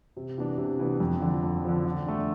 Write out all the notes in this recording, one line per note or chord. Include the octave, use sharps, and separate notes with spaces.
C3
E3 B3 D4
C3
E3 B3 D4
F2
D3 F3
F2
D3 F3
D3
A3 D4